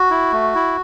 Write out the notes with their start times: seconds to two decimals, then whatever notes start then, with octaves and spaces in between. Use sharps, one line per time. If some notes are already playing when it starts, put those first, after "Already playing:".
Already playing: F#4
0.10 E4
0.32 A3
0.55 E4